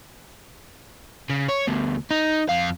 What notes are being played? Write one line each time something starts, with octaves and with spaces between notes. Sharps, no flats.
C#3
C#5
D2 B2
D#4
F2 F5